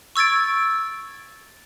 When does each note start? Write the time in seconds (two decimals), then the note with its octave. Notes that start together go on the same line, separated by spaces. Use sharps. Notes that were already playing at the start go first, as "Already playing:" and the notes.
0.16 C#6 E6 G#6 A6 D7